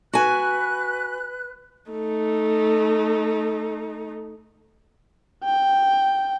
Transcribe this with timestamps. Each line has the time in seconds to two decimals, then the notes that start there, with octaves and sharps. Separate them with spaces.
0.13 F#4 B4 G#5 F#6
1.91 A3 D#4
5.44 G5